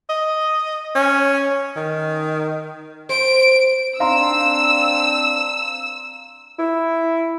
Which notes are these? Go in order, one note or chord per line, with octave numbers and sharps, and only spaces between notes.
D#5
C#4
D#3
C5 D7
C4 D4 F5 A#5 C6 E6
E4